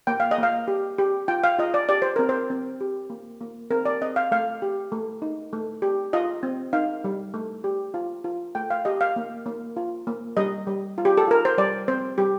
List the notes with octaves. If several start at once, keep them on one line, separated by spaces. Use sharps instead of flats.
A#3 G5
F5
D#5
A#3 F5
G4
G4
F4 G5
F5
F4 D#5
D5
G4 D5
C5
C4 A#4
C5
C4
G4
A#3
A#3
C4 A#4
D5
C4 D#5
F5
A3 F5
G4
A3
D#4
A3
G4
F4 D#5
C4
D#4 F5
G3
A3
G4
F4
F4
A3 G5
F5
G4 D#5
F5
A#3
A#3
F4
A#3
G3 D#5
G3
F4
G4
A4
F4 A#4
C5
G3 D5
C4 C5
G3 G4